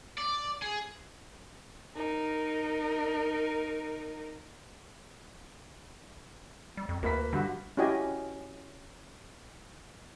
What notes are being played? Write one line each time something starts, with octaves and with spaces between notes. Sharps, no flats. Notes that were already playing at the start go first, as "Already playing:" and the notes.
D5
G#4
D#4 A#4
G3
F2
D2 A#3 B4 B6
G2 D3 F#4
C#4 E4 F#4 G4 D#5 G#5